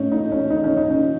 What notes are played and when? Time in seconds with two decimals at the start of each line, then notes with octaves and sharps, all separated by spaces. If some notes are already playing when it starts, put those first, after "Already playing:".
Already playing: A2 A3 C#4 D#4
0.12 D#4
0.32 C#4
0.50 D#4
0.64 C#4
0.77 D#4
0.90 C#4